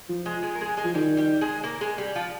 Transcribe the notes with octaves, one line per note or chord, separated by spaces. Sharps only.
F3
G#3 G#4
G#3 G#4
A#4
G#3 G#4
G#3 G#4
F3
D#3 G3 G4
G3 G4
G#3 G#4
A#3 A#4
G#3 G#4
G3 G4
F3 F4